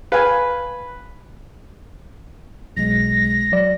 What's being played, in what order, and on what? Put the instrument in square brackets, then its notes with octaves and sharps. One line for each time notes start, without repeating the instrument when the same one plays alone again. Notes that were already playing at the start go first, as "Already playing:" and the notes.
[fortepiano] B4 [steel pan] F5 G5 G#5
[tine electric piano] B1 G#3 [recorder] A#6
[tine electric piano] F#3 D5